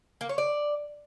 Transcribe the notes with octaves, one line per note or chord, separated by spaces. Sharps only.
A#3
C#5
D5